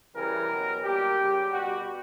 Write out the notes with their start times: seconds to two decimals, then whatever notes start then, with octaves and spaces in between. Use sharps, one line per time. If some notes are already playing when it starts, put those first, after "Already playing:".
0.15 C#3 E3 G3 A#4
0.49 B2 F#3
0.83 A#2 G3 G4
1.17 C#3 G3
1.52 B2 G3 F#4